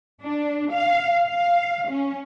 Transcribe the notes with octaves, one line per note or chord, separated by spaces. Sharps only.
D4
F5
F5
C#4